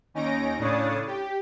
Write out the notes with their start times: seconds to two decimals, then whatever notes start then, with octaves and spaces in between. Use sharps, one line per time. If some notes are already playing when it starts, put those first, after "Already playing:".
0.14 D#2 C#4 D#4 A#6 D7
0.58 A2 C#3 D4 C#5 D#6 A6
1.07 G4